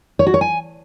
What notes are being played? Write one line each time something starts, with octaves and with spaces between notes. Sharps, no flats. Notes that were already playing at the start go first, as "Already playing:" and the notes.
C#5
F#4
C#5
G#5